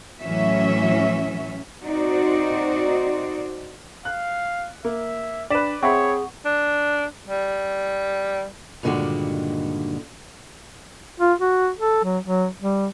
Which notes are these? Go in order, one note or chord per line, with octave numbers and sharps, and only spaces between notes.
A2 E3 F#3 C#4 E5
C4 D#4 F#4 C5 D5
F5 F#6
A#3 E5
D4 B4 D5 B6 E7
C4 G#4 C#5 E5 F#5 B5 C#6
D4
G3
G2 A#2 D3 D#3 G#3 F#4
F4
F#4
A4
F#3
F#3
G3